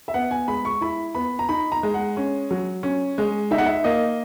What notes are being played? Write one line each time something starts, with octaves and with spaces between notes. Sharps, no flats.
E5
B3 F#5
G#5
G#3 B5
C#6
E4 B5
B3 B5
A#5
D#4 B5
A#5
G#3
F#5
C#4
F#3
C#4
G#3
D#4 E5
F#5
E5
A#3 D#5